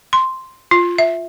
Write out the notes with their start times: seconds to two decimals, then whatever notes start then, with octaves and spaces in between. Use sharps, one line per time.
0.13 C6
0.71 F4
0.98 E5